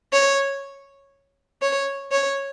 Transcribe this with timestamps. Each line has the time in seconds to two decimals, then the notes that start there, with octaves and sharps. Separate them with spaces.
0.13 C#5
1.62 C#5
2.11 C#5